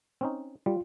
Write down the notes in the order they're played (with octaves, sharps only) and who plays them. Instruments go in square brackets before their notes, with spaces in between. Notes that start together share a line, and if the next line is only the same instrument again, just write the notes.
[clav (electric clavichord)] C4 C#4 D#4
[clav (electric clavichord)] G3 [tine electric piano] F4